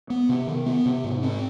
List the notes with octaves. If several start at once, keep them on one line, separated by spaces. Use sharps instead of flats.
B3
C3
D#3
B3
C3
G#2
C4